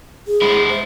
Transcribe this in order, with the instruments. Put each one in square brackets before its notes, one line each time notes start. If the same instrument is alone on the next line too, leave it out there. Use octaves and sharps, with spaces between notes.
[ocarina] G#4
[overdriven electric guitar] G#3 E4
[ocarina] C5